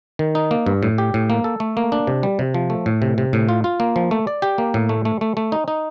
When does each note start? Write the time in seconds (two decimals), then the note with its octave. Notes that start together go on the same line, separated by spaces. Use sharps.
0.19 D#3
0.35 D#4
0.51 A#3
0.66 G2
0.83 A2
0.98 G4
1.14 A2
1.30 A#3
1.44 A4
1.60 A3
1.77 A#3
1.92 D4
2.07 C3
2.23 G3
2.39 C3
2.54 F3
2.70 A3
2.86 A2
3.02 C3
3.18 C3
3.33 A2
3.48 F4
3.64 F4
3.80 A#3
3.96 F3
4.11 A3
4.27 D5
4.42 G4
4.58 A#3
4.74 A2
4.89 A3
5.05 A3
5.21 A3
5.37 A3
5.52 D#4
5.68 D#4